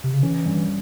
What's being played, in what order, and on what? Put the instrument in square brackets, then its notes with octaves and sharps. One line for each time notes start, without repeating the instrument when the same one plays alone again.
[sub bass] C3
C#3
[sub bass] E3 [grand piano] C#4
[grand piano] G2